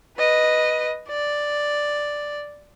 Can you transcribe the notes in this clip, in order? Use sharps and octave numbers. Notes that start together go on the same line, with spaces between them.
B4 D#5
D5